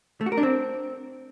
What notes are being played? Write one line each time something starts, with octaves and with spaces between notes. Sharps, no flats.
A3
F#4
A#4
D4
C4